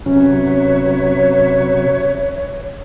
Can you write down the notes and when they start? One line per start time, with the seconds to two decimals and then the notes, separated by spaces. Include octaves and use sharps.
0.06 C3 F#3 C#4 B4 C#5 E5